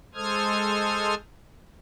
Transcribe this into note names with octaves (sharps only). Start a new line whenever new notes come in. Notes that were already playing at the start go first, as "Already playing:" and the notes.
G#3 A4 C5 D#6 F6 G#6